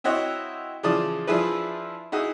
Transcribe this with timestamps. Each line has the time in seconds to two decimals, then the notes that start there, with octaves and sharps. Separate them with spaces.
0.04 C4 E4 F#4 C#5 D#5 F#5
0.83 C#3 E3 F3 D5 A5 D#6
1.27 F3 D4 E4 G#4 B4
2.12 D#4 E4 F#4 G#4